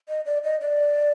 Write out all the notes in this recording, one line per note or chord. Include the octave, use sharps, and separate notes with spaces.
D#5
D5
D#5
D5